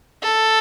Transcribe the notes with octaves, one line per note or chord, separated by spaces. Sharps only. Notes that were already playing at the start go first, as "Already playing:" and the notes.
A4